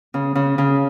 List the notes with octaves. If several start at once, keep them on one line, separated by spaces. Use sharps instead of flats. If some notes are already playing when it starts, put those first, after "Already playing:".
C#3
C#3
C#3